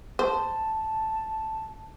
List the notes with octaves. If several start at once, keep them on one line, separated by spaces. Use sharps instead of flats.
C5 A5